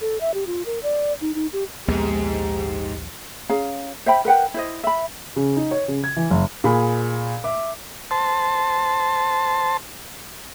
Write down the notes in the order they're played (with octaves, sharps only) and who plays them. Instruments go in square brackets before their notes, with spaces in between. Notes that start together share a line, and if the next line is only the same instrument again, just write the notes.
[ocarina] A4
E5
G4
F4
A#4
D5
D#4
D#4
G4
[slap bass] A#1 D#2 B3 [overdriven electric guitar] G#2 [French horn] G4
[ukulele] C#4 G#4 F5 A#5
C5 E5 G5 B5
A#4 B4 F#5 G5
E4 C5 D#5
E5 B5
[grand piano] C#3
D#4
C#5
C#3
G#6
E3
F#1
[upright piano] A#2 G#4 B5
E5 D6
[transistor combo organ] C5 A5